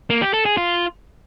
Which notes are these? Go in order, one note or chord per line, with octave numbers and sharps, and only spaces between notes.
A#3
G4
A4
G#4
F4